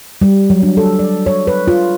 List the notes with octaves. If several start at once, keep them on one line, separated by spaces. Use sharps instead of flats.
G3
F#3
D4
A4
D5
C#5
B4
F4